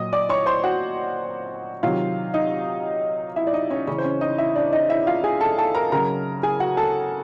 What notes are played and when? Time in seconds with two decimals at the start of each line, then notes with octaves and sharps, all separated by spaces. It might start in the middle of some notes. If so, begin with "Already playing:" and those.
Already playing: A#2 F#3 D#5 D#6
0.13 D5 D6
0.29 C#5 C#6
0.46 C5 C6
0.64 F#4 F#5
1.83 C3 D#3 F#3 F4 F5
2.34 D#4 D#5
3.36 E4 E5
3.47 D5
3.53 D#4 D#5
3.70 C#4 C#5
3.87 C#3 E3 C#4 C#5
3.98 C5
4.05 C#4 C#5
4.21 D#4 D#5
4.38 E4 E5
4.56 D4 D5
4.72 D#4 D#5
4.90 E4 E5
5.07 F4 F5
5.24 G#4 G#5
5.41 A4 A5
5.58 A4 A5
5.75 A#4 A#5
5.92 C#3 F#3 A#4 A#5
6.43 G#4 G#5
6.60 F#4 F#5
6.77 A4 A5